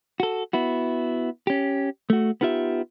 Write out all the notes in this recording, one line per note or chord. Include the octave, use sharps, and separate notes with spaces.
F#4 A4
B3 E4 F#4
C#4 G4
A3 F#4
B3 D#4 F4 G4 E5